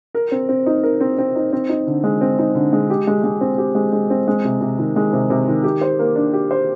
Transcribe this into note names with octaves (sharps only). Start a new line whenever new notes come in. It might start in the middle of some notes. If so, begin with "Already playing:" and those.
A#4
C4
C4
D#4
A#4
C4
C4
D#4
C4
D#4
D3
G#3
C4
D#4
D3
G#3
G4
G#3
G#3
C4
G4
G#3
G#3
C4
G#3
C3
C3
D#3
G#3
C3
C3
D#3
G4
C5
A#3
D4
G4
C5